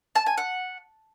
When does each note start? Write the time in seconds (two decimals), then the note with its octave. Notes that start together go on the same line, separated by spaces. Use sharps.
0.15 A5
0.26 G#5
0.37 F#5